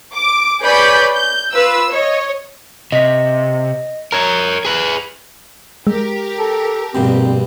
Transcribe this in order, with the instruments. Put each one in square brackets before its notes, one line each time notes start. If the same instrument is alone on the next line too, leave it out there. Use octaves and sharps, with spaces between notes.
[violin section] D6
G#4 B4 C#5 D5 B5 G6
G6
F4 B4 E6
C#5 D#5
[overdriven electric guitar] C3 [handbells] D#5 B6
[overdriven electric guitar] A#4 C#5 [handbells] A#5
[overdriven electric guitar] G#4 B4
[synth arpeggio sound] G#3 [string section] G4 A#4
[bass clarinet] A4
[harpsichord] A#1 G2 B2 [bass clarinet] C4